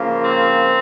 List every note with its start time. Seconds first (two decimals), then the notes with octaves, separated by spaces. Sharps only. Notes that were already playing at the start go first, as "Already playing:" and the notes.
Already playing: C#3 F3 A#3
0.25 C4